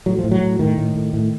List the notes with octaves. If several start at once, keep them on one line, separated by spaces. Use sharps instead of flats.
A2 F#3
F3
A2
F#3
A2
A2 D#3
A2
A2
A2